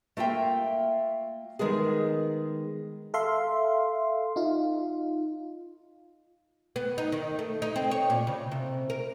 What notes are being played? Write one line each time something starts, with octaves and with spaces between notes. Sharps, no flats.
A3 A#3 F4 E5 G5
D#3 G#3 B3 G#4
A4 E5 F5 C6
D#4 F4
B3
D#4
D#3
A3
D#4
C4
C#5
A#2
C#3
C3
A#4